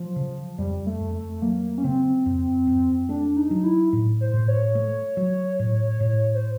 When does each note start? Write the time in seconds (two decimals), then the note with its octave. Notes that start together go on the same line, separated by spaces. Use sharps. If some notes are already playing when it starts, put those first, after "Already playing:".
Already playing: F3 F#3
0.16 C#3
0.58 F2 G3
0.86 A3
1.00 F2
1.15 A3
1.42 F#3 A#3
1.78 C#4
1.84 C#3 C4
2.26 F2
2.67 F2
3.09 A3 D4
3.37 D#4
3.51 F#3
3.64 E4
3.93 A2
4.21 C5
4.33 A2
4.48 C#5
4.75 A3
5.17 F#3
5.59 A2
6.00 A2
6.34 C5